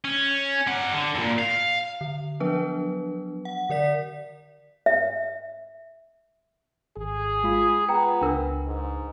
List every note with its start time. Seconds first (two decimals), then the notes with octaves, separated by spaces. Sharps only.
0.05 C#4
0.67 G3 F#5
0.94 D3
1.15 E2 A#2
1.39 F5
2.01 D3
2.40 F3 F#3 B3 D4 B4
3.45 F#5
3.69 D3 A#4 D5 B6
4.86 E5
6.97 G#1 G#4
7.44 G#3 F4 B5
7.89 B3 G5 A#5
8.22 C#2 D4 A#4 B4
8.67 G#2